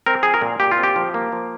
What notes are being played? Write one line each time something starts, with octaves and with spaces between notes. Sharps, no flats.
C4 A#4
F3 G#4
A#4
A#2
A#2 G4
F4
C4
G4
F3
A#3
F3